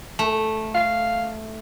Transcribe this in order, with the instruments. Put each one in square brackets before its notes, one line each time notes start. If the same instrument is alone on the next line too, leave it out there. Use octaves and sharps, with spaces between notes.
[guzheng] A3
[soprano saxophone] F5